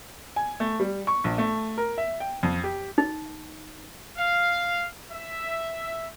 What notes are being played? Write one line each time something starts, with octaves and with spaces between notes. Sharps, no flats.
G#5
A3
G3
C#6
A#1
A3
A#4
E5
G5
F2
G4
D#4
F5
E5